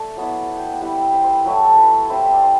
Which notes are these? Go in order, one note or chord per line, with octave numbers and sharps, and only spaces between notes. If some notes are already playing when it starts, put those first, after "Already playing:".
Already playing: A3 D5 E5
F#3 B3 E4
F#5
G5
F#5
G5
G3 C4 E4 F#5
E5
C5
C5
B4
F#3 A3 E4 G4
A4
B4
G3 C4 E4 C5
E5
D5
C5